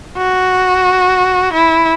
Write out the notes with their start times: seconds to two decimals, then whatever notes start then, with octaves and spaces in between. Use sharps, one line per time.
0.17 F#4
1.53 E4